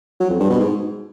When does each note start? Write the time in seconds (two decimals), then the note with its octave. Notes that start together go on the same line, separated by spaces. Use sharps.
0.20 F#3
0.30 F2
0.40 G2
0.50 B2
0.60 G#2